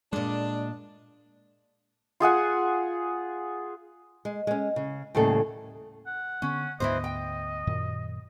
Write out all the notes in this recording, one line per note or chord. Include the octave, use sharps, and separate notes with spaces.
A#2 G#3 D4 D#5
F4 G#4 F#5 G#5
G#3
G#3 C#4
C#3
D#2 A2 C#3 G3 A4
F#5
D3 B3 C#4
D2 G#2 E3 B3 B4 C5 D#5
G5
F#2 A#2 D#3